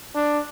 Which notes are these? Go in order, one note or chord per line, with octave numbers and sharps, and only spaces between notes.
D4